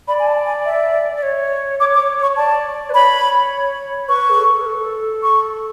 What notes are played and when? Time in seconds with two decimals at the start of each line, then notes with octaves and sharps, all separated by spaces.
0.08 D5 B5
0.19 G#5
0.27 A5
0.46 G#5
0.65 E5
1.17 D5
1.23 C#5
1.80 C#5 D6
1.94 D6
1.98 C#5
2.18 C#5 C#6
2.36 D5 A5
2.90 B4
2.94 C#5 B5
4.09 B4 C#6
4.30 G#4
4.38 A4
4.61 B4
4.66 A4
5.23 C#6